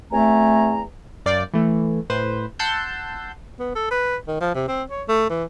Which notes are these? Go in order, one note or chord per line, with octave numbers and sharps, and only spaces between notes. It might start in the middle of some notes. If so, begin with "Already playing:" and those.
E2 A3 C4 G#5 A#5
F#2 D5 F5 G5
E3 A3
A2 B4 C5
F#5 A5 C6 E6 G6
B3
A4
B4
D#3
F3
C3
C4
C#5
A3
E3